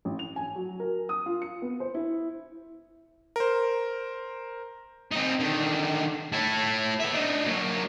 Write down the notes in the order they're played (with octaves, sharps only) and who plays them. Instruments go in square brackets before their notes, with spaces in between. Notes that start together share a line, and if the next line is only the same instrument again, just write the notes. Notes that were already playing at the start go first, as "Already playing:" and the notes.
[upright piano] A1
F7
G#5
F#3
A#4
D#6
F4
C#7
B3
C5
E4
[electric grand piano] A#4 C5
[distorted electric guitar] C4 D#4
D3 D#3
A3 E4
B3 E5
D4 D#4
F#3 A#3